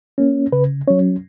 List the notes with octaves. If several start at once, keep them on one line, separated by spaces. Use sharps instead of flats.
A#3 C#4
C#3 B4
F#3 C#4 C#5